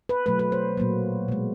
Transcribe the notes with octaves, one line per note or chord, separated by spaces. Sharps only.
B4
B2 F#3 A3 B4
B4
C5
A#2 F#3 A#3
B2 G#3